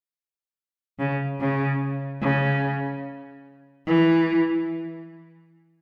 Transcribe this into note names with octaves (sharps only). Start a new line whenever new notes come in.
C#3
C#3
C#3
E3